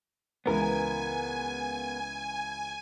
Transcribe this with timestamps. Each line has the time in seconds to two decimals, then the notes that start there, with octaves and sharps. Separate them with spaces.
0.46 C#2 E3 B3 A#4 B4 G#5